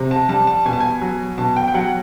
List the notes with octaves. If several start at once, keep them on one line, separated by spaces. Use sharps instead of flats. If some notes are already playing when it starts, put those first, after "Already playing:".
Already playing: C3
A5
G3 A5
A5
B2 G#5
A5
G#5
F#3
B2 A5
G5
G5
F#3 F#5